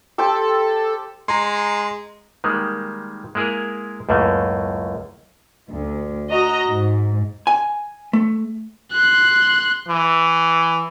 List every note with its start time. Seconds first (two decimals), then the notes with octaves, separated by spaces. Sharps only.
0.18 G4 A4 C5 G5
1.28 G#3 A#5 C6
2.44 D#3 G3 G#3 A#3
3.35 G#3 A#3 E4 G#4 A#4
4.09 C#2 F#2 A2 A3 A#3
5.70 D2
6.29 F#4 D#5 A#5
6.66 G#2
7.47 G#5
8.13 A3
8.92 C6 F#6
9.89 E3